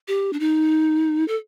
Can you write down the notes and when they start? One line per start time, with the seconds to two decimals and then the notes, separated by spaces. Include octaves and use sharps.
0.08 G4
0.33 D4
0.40 D#4
1.28 A4